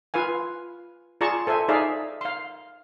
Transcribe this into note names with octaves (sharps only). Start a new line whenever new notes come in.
F4 B4 F5 G#5
F4 G#4 D5 A5 A#5 C#6
A4 C5 E5 G#5
D#4 G#4 D5 E5 F5
F5 C6